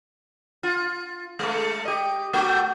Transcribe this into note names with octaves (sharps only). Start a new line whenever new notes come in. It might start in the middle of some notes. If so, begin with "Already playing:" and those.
F4
G#3 A3
G4 D#5
A3 F#4 G4